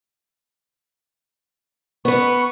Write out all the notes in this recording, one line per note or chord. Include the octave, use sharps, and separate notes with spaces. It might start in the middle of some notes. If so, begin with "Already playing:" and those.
B3 B4 C#6